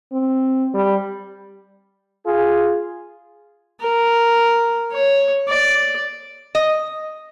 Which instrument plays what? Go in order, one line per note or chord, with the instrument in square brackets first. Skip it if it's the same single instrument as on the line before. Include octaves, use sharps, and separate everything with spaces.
[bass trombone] C4
G3
[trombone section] F4 G#4
[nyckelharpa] A#4
C#5
D5
[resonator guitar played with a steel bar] D#5